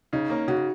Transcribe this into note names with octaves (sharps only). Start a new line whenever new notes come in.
C#3 D#4
A#3 C#4
C#3 F#4